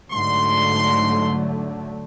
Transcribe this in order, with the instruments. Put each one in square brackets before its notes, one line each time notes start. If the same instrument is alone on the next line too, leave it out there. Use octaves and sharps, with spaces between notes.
[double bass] G#2 [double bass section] D3 F#3 A3 [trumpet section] C6